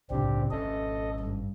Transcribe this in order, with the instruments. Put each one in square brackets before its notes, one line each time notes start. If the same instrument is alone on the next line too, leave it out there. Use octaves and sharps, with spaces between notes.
[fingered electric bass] C2 A2 C#3 [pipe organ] C4 D4 G4
[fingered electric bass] G#1 C#4 [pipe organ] A4 D#5
[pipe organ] G2